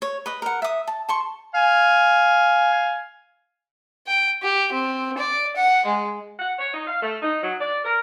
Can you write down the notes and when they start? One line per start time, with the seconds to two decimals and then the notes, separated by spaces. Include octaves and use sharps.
0.02 C#5
0.26 B4 D#5
0.42 A#4 F#5
0.62 E5 D#6
0.87 A5
1.09 A5 C6 C#6
1.55 F5 G#5
4.07 G5
4.42 G4
4.72 C4
5.18 D5
5.56 F#5
5.85 G#3
6.39 F#5
6.58 C#5
6.73 D#4
6.87 F5
7.01 A3
7.21 D#4
7.42 F#3
7.60 D5
7.84 A#4